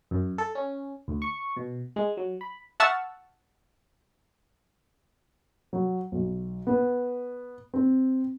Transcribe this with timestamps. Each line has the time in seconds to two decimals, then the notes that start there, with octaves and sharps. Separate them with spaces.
0.11 F#2
0.38 A4
0.55 C#4
1.08 D2
1.22 C#6
1.57 B2
1.96 G#3
2.17 F#3
2.41 B5
2.80 E5 F#5 A5 C#6 E6 F6
5.73 F#3
6.12 B1
6.67 B3
7.74 C4